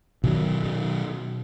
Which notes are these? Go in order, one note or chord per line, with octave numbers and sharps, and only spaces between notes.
B2 D#3 F#3